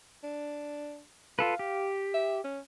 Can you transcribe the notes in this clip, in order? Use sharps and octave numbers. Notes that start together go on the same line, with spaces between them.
D4
F4 A4 B4 F5
G4
E5
C#4